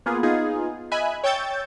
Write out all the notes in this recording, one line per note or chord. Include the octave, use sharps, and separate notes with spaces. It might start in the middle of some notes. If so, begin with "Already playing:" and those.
A#3 B3 F4 G#4
B3 D#4 F4 G#4
D#5 E5 G#5 B5 F#6
C#5 G5 C#6 E6 G6 A6